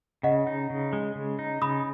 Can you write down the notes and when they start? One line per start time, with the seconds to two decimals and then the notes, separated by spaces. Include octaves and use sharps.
0.23 C#3 D#5 F#5
0.47 D#4
0.70 C#3
0.93 G#3
1.15 C#3
1.39 D#4
1.62 C#3 B5 D#6